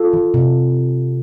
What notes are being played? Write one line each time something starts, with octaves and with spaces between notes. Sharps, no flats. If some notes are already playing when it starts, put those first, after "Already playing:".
Already playing: F4 A4
E3
C3